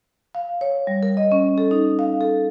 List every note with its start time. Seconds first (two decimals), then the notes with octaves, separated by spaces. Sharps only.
0.35 F5
0.61 C#5
0.87 G3
1.03 A#4
1.17 D#5
1.32 C#4
1.58 A4
1.71 D#4
1.99 F5
2.21 A4